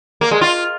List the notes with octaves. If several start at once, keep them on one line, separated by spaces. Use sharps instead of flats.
A#3
G#3
F4